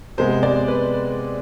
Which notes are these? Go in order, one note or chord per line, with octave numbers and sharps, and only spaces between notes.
C3 G#3 B3 C5
D5
B4